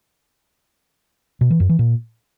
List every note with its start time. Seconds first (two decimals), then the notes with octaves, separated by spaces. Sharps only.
1.41 B2
1.50 E3
1.60 F#2
1.69 E3
1.79 A#2